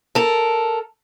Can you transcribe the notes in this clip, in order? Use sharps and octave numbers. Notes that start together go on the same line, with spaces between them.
A4 A#4